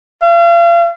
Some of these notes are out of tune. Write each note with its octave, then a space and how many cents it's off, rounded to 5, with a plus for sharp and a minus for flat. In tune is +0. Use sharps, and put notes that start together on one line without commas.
F5 -40